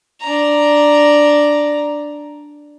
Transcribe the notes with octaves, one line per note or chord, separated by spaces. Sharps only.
D4 A#5